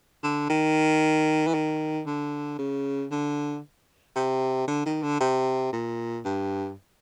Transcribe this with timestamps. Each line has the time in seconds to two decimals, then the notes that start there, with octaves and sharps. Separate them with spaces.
0.23 D3
0.50 D#3
1.47 E3
1.54 D#3
2.06 D3
2.59 C#3
3.11 D3
4.16 C3
4.68 D3
4.86 D#3
5.02 D3
5.20 C3
5.73 A#2
6.25 G2